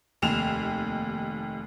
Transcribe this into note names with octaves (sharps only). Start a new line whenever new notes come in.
F1 D#2 E7 F7